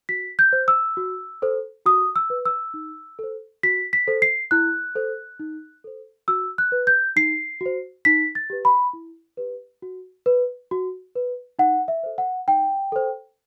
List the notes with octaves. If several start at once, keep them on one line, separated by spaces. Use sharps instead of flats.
F#4 B6
G6
C5
E6
F#4
A4 C5
F#4 D#6
E6
B4
E6
D#4
A4 C5
F#4 B6
B6
A4 C5
C7
E4 F#6
A4 C5
D#4
A4 C5
F#4 E6
F#6
B4
G6
D#4 C7
F#4 C5
D#4 B6
A6
G4 B4
B5
E4
G4 B4
F#4
B4
F#4
B4
D#4 F#5
E5
A4 C5
F#5
D#4 G5
A4 C5